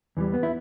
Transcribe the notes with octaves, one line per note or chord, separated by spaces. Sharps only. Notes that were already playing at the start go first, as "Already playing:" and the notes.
E2 E3 G3
B3
E4